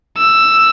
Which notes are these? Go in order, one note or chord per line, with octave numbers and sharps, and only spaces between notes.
E6